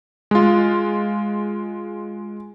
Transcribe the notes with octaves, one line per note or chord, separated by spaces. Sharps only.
G#3 F4